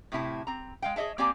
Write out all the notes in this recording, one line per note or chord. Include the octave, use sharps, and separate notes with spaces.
A2 C3 E4 A5
C4 A#5
G#3 F5 G5
G#4 C#5 D#5 E5 A5
A#3 C4 G4 D5 G#5 A#5